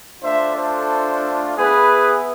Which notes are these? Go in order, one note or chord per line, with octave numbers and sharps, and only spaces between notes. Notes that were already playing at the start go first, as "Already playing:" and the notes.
A3 D4 F4 C5 E5
A4 C5
B3 E4 G#4 B4